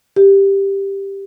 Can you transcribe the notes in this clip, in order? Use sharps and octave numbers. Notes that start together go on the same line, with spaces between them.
G4